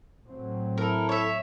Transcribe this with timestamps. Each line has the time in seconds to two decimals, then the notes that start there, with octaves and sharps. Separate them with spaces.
0.25 A2 F#3 C4
0.78 E4 A4 A#4
1.09 C#5 E5